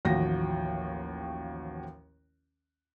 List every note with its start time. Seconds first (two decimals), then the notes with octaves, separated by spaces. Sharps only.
0.05 A1 D#2 F3 F#4 G5 A#6